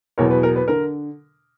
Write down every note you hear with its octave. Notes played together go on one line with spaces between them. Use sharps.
E2 B2 F#3 A#4 C#5
B4
A#4
B4
D3 A#4